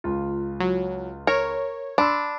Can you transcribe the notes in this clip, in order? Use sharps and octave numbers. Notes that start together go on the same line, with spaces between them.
C#2 F4
F#3
A#4 C#5
D4 B5 C6 E6